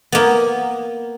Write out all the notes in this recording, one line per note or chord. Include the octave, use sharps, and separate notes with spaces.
A#3 B3